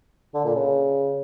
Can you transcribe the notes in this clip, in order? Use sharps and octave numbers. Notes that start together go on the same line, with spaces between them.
D3
A#2
C#3